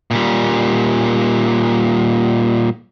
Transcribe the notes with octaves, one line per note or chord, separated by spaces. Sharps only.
A#2 G3